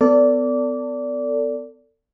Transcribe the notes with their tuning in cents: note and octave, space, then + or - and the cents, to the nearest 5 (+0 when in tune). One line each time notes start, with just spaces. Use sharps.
B3 +35 A4 +30 D5 -20